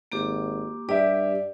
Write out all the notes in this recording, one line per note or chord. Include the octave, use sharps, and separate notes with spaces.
G#1 A#3 G4 D6
G2 G4 D5 E5